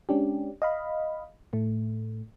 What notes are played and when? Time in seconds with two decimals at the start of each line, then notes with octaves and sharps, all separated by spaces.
0.09 G#3 C#4 D4 G4
0.62 D#5 F5 B5
1.53 A2 A3